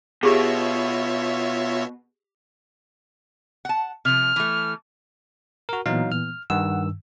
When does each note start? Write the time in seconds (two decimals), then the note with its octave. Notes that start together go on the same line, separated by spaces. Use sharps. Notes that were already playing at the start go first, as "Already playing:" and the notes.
0.23 B2 F4 G4 G#4 C#5 E5
3.65 F#5 A5
4.05 C3 F3 F6
4.36 E3 A3
5.69 F#4 A#4
5.86 A#2 E3 F#3 B3 D#4 F5
6.12 F6
6.50 G2 D#3 F#5 E6